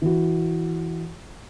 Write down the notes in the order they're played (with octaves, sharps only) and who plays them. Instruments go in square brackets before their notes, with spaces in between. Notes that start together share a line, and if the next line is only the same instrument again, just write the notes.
[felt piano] E3 F#4